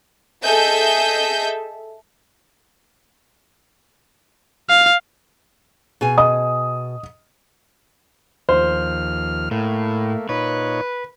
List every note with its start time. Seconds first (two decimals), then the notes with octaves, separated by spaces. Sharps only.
0.42 G#4 A4 D#5 E5 G6
4.69 F5
6.01 B2 G#4 G#5
6.18 D#5 D#6
8.49 D#2 F3 C5 F6
9.51 A2 A3 A#3
10.29 A#2 D#4 B4 C#5